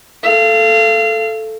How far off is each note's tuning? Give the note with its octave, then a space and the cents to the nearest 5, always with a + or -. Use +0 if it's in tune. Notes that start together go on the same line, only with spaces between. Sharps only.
A4 +0 F5 -30